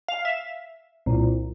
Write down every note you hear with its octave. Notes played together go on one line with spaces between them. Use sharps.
F5
E5
C2 A#2